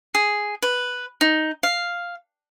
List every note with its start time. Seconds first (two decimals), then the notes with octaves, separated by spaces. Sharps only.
0.15 G#4
0.62 B4
1.21 D#4
1.63 F5